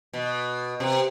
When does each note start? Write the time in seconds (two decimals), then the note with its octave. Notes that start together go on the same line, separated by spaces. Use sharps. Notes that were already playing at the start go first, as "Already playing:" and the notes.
0.13 B2
0.80 C3